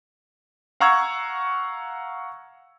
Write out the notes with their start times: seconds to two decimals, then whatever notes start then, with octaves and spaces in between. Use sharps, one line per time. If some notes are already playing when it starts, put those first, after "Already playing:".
0.80 F5 F#5 A#5 C#6 E6 G#6